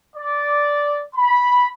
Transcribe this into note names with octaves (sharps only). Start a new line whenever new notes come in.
D5
B5